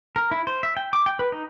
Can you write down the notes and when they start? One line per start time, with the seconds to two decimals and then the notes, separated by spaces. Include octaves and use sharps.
0.16 A#4
0.31 E4
0.47 C5
0.63 E5
0.77 G5
0.93 D6
1.06 G5
1.19 B4
1.32 D#4